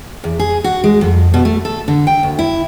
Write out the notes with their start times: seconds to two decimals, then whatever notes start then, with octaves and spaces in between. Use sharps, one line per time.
0.24 E2
0.39 G#4
0.64 F#4
0.84 G#3
1.01 F2
1.34 B2
1.45 A3
1.65 A4
1.88 D3
2.07 G5
2.23 D2
2.39 E4